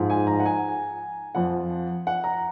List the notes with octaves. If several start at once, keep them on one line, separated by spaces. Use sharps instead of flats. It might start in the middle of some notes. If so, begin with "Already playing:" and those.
Already playing: G#2 F3
G#5
A#5
F#5
G#5
F2 F3 F#5
F#5
A#5